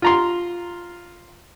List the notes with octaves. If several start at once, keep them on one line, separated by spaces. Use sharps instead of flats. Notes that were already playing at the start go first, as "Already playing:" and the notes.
F4 A#5 C6